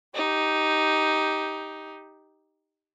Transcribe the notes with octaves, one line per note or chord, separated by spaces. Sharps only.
D#4 G4